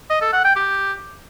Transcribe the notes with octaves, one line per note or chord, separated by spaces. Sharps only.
D#5
A4
F#5
G5
G4